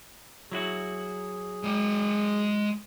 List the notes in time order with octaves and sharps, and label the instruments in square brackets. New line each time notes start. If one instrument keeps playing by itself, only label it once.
[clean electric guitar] F#3 E4 F#4 [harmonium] G#4
[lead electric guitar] G#3 G5